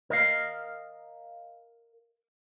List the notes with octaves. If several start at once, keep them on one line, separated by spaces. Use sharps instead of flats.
A#4 D#5 F5